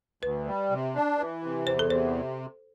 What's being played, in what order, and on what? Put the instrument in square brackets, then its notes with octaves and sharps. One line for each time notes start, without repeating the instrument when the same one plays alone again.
[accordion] D2 [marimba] B4
[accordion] G3
C3
D4
E3
C3
[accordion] E2 [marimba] C5
[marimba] A4
[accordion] C3 [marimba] C5